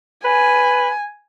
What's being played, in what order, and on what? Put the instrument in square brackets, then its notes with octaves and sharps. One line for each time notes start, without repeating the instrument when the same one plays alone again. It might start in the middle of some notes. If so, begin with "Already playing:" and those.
[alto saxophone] B4 [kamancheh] G#5